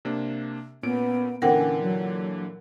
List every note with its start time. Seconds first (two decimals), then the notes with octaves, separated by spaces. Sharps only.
0.05 C3 A#3 D4
0.83 A#2 B3 C#4 D7
1.42 A#2 D3 E3 C4 A#4 F#5 G5
1.53 C#4
1.82 F#3